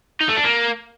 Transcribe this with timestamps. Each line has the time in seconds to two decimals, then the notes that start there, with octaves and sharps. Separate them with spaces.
0.20 D#4
0.28 A3
0.36 D4
0.44 A#3